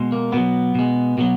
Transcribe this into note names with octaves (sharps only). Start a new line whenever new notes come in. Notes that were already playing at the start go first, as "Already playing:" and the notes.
Already playing: B2 G#3
A#3
B2 F#3 B3
B2 G#3
B2 F#3 B3